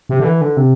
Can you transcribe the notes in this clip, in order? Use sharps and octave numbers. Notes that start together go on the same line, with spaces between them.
C3
D3
E3
D3
C3